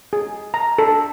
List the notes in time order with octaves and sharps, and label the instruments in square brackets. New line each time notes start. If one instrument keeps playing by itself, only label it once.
[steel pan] G#4
A#5
A4